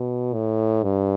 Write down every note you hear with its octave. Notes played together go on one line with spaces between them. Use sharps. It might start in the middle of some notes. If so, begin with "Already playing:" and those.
Already playing: B2
A2
G2